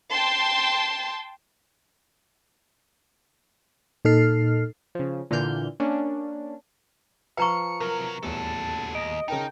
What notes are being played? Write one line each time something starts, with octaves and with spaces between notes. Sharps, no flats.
G5 A5 C6
A#2 D#4 A4 F6 C7
C#3 F3
A#2 D3 E3 A#3 F6 G6
A#3 C#4 D4
F3 B4 F5 A#5 C#6 C#7
C3 F#3 A#4
D#1 A1 E2 F#4 A4 A5
D#2 D#5 D7
C#3 D#4 A#4 G5 A5